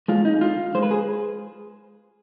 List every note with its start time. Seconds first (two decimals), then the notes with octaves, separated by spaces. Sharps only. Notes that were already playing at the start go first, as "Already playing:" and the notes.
0.08 G#3 F4
0.25 D#4
0.41 D3 F4
0.75 G#3 C5
0.83 B4
0.91 G#4